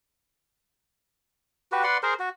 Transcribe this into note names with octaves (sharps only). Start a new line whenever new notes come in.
F#4 G4 B4
B4 D5 F#5 C6
G#4 A#4 C5
F#4